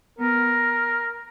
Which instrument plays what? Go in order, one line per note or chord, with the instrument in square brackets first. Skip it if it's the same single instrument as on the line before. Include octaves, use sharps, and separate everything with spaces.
[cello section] B3 [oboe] A#4